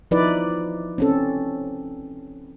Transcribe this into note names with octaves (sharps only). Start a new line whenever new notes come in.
F3 D#4 E4 B4 D5
C4 C#4 A4